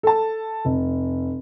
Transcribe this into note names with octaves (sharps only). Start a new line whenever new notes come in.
A4 A5
F1